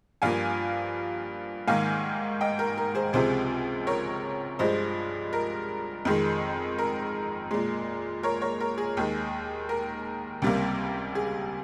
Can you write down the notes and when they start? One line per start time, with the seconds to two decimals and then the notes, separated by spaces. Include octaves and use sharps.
0.22 G2 F3 A#3 F5 G#5
1.68 G#2 D#3 A#3 F5 G#5
2.41 D#5 G5
2.59 A#4
2.78 A#4
2.95 G#4 C5
3.13 C#2 C3 F3 G#3 G#4 C5
3.87 A#4 C#5
4.59 G2 F3 G#3 C5 D#5
5.33 A#4
6.05 F2 D#3 G#3
6.78 A#4
7.51 A#2 G#3
8.23 A#4 C#5
8.42 A#4 C#5
8.60 A#4
8.78 G#4
8.97 D#2 D#3 G#3
9.69 A#4
10.42 C#2 C3 G3 A#3
11.15 G#4